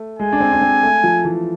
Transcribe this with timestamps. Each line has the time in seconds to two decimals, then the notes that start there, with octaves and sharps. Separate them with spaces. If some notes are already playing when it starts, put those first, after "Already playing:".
Already playing: A3
0.19 G#3 G#5
0.33 D4
0.40 C4
0.53 D4
0.62 C4
0.83 A3
1.04 F3
1.25 E3